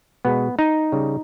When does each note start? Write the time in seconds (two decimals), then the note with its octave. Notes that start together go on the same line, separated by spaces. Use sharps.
0.25 B2 G#3 B3
0.59 D#4
0.92 C#3 G3